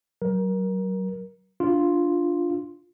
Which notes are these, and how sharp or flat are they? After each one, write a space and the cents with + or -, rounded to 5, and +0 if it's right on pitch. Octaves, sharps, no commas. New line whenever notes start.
F#3 +30 A#4 +20
D4 +0 F4 +0